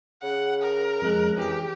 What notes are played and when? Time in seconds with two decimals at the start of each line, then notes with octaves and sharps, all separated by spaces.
0.23 C#3 F#5
0.62 A#4
1.02 F2 C#3 G#3 F#6
1.37 E3 G4 G#4